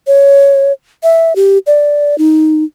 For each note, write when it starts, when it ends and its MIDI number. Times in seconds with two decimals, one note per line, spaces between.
0.07 0.72 73
1.03 1.36 76
1.36 1.58 67
1.67 2.18 74
2.18 2.64 63